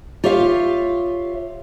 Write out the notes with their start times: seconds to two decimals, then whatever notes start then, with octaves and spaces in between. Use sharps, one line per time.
0.24 F4 G4 C#5 E5 F5